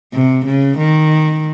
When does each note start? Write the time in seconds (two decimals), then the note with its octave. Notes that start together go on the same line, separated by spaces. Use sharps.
0.14 C3
0.46 C#3
0.78 D#3